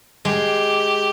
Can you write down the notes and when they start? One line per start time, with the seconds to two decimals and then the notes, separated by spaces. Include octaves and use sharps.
0.25 G#3 G4